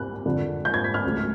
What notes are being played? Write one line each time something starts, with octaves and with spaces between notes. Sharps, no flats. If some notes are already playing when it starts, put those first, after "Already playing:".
Already playing: C2 C3 F#6
F2 D3 F3
G6
G#6
B6
F6
C#2 C#3 F#3 A3